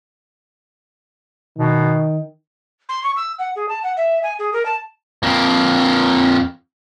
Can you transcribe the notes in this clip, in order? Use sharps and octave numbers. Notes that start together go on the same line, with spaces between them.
B2 D#3
C6
C#6
E6
F#5
G#4
A5
F#5
E5
G#5
G#4
A#4
A5
F2 A#3